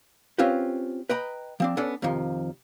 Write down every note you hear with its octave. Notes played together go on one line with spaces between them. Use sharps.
C4 C#4 F4 G4 B4 C5
B4 D#5 G5 A#5 B5
F3 C4 D4
B3 C#4 D4 A4 D5
F2 C3 D#3 F3